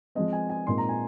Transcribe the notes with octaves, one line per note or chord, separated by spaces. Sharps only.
F3 G#3 C4 D#5
G#5
G#5
A#2 G#3 C4 D#4 C6
A#5
G#5